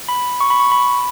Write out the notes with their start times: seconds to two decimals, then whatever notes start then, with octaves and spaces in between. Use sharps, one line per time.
0.08 B5
0.41 C#6
0.50 B5
0.60 C#6
0.72 B5